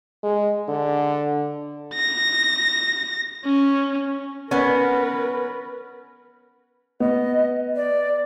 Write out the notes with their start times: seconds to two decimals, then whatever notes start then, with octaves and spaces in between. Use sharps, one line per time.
0.23 G#3
0.69 D3
1.95 A#6
3.45 C#4
4.51 B3 C#4 A#4 B4
7.00 B3 D#5
7.76 D5